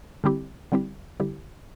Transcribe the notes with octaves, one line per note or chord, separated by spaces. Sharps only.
D3 G3 C4 E4 G4
D3 G3 C4 E4 G4
D3 G3 C4 E4 G4